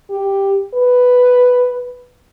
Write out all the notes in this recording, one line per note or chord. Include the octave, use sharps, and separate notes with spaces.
G4
B4